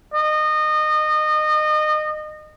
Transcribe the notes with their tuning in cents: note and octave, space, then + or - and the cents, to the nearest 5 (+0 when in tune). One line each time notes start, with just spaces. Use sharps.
D#5 -25